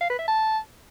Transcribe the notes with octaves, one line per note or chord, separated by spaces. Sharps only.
F5
B4
E5
A5